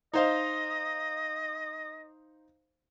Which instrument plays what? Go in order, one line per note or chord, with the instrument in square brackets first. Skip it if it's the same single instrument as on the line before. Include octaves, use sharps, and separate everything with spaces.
[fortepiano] D#4 C5 F5 [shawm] D#5